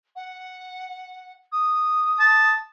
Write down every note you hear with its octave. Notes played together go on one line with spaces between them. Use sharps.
F#5
D#6
A5